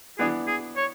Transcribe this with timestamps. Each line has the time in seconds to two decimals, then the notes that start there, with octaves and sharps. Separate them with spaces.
0.18 E3 B3 D4 G#4
0.47 G#4
0.77 C#5